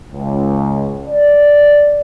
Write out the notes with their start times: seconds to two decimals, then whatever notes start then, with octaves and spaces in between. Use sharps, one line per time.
0.11 C#2
1.06 D5